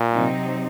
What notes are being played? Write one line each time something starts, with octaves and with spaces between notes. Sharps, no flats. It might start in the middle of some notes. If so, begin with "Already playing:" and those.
Already playing: A#2
C3 F#3 C4 D#4